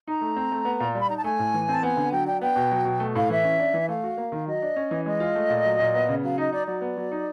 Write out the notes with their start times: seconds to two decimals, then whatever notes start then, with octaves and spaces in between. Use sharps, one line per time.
0.07 D#4 A#5
0.21 A3
0.36 C4
0.52 A3
0.65 B3
0.80 A#2
0.95 G3
1.00 B5
1.08 D#4 A#5
1.16 A5
1.24 A3 G#5
1.39 A2
1.54 E3
1.69 C4 A5
1.83 B3 G#5
1.97 D3
2.12 F#3 G5
2.26 D4 G5
2.42 B3 G5
2.56 B2
2.72 F#3
2.85 B2
3.00 A3
3.15 A2 F5
3.30 E3 E5
3.44 C#4
3.59 D4
3.74 E3
3.88 A3 F5
4.04 F#4
4.17 A#3
4.32 D#3
4.47 F#3 D#5
4.62 D4
4.76 C#4
4.91 E3
5.06 G#3 D#5
5.20 F4
5.35 A3
5.50 A#2
5.65 F#3
5.79 A#2
5.94 B3
6.09 C#3
6.23 F#3 F5
6.38 D#4 D#5
6.52 D#4 D5
6.67 F#3 D5
6.81 B3
6.97 F#3
7.12 D#4